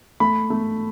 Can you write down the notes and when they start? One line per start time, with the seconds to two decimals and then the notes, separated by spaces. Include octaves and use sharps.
0.20 A3 B5
0.50 A3